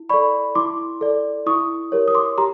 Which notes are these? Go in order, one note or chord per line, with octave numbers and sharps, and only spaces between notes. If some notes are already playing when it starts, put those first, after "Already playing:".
Already playing: E4
A4 D5 B5 C#6
E4 C6 D6
A4 D5
E4 C#6 D#6
G4 A#4 C#5
D#6
C6 D6
G4 A#5 C6